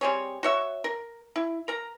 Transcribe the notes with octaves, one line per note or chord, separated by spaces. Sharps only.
G3 C4 G#4 C#5
F#4 C#5 E5
A#4
E4
A#4 A#5